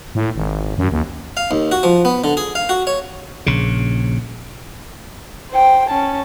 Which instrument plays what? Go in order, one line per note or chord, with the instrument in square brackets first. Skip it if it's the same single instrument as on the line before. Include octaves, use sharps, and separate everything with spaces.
[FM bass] A2
G#1
F#2
D#2
[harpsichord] F5
D#2
F#4
F3
B3
D3
G#4
F5
F#4
C#5
[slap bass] A#1 C#3
[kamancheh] C5 G5
C#4 A5